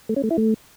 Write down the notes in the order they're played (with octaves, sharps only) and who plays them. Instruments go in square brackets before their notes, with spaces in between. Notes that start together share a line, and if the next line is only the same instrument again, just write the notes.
[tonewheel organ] A3
C#4
A3
E4
A3